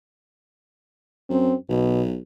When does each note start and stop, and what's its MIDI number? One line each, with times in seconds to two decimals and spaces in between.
1.30 1.54 42
1.30 1.54 60
1.69 2.19 35
1.69 2.02 47